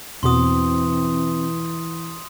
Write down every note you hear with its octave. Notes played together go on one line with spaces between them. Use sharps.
E2 B2 E3 C4 F#4 C6 D#6